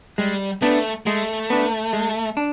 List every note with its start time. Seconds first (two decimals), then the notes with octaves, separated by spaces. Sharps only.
0.18 G3 G#3
0.62 A3 B3 D4
1.06 G#3 A3
1.50 B3 D4
1.93 G#3
2.37 D4